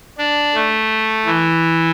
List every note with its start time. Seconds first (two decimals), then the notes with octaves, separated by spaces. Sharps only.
0.18 D4
0.54 A3
1.25 E3